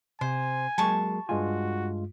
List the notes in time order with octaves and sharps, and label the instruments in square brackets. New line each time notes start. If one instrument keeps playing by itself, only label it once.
[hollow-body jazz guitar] C3 [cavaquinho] C5 [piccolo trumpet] G#5
[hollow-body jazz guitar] F#3 G#3 A#3 [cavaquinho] A5 C#6
[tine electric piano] G2 G#3 F4 [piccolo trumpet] F#4 [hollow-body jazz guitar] G#5